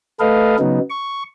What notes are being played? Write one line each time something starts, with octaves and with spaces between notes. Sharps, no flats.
A3 A4 B4 D#5 F5
C#3 F#3 B3 D#4
C#6